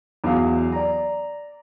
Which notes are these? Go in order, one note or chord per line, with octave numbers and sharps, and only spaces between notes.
E2 F#3 F5
D5 A#5